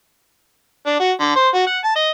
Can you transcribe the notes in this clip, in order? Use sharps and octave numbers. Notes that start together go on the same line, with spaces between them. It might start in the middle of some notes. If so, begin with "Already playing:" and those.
D4
F#4
D3
C5
F#4
F#5
A5
D#5